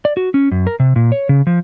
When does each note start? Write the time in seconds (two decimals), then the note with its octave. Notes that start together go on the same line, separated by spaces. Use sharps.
0.05 D5
0.17 F#4
0.34 C#4
0.51 F#2
0.67 A#4
0.80 C3
0.96 A#2
1.12 C#5
1.29 C#3
1.47 F3